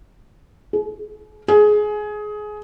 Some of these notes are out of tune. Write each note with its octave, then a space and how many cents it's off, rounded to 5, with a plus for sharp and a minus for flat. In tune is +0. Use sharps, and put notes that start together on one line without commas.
G#4 +45
G#4 +20